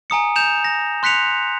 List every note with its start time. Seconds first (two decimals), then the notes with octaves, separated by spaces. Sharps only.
0.10 G#5 A#5 D#6 C#7
0.36 G6 E7 F7
0.64 A#6
1.03 C6 F#6 B6 C#7 F7